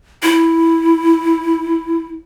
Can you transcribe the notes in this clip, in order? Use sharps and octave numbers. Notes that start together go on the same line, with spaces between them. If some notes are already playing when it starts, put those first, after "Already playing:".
E4